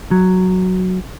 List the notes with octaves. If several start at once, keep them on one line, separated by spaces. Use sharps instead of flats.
F#3